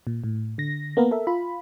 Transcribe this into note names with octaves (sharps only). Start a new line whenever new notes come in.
A#2
A2
D3 A#6
A#3 B3 A#4
A4 A#4 E5
F4 B5